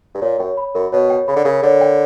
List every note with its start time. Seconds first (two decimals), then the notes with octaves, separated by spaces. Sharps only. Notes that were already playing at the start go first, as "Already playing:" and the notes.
0.14 G2
0.22 A#2 C#5
0.39 F#2 G5
0.57 B5
0.74 F#2 A#4
0.92 B2 C#5
1.10 G5
1.28 C#3 B5
1.36 D3
1.44 C#3 A#4
1.63 D3 C#5
1.81 G5